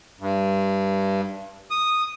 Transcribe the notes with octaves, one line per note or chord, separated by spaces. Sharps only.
G2
D#6